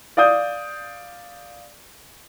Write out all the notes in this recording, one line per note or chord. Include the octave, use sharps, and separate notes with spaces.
D5 F5 D#6 G6